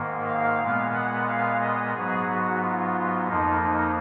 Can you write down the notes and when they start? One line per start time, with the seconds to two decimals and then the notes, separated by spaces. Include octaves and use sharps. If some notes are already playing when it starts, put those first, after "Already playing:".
Already playing: G#2 D#3 A#3
0.28 F5
0.60 A#2 G#3 B3
0.94 F#5
1.27 F5
1.60 D#5
1.95 G#2 F#3 B3 G#4
2.28 F#4
2.61 F4
3.28 F2 F3 A#3 D#4
3.61 D#4